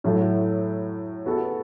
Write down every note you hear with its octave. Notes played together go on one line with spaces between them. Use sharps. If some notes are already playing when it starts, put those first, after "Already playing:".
A2 F#3 A3 E4 A4
B3 F#4 A4